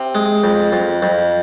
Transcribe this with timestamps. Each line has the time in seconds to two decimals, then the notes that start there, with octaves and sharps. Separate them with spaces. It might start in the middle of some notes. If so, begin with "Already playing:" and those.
Already playing: C3
0.15 G#3
0.44 F2
0.73 F2
1.02 F2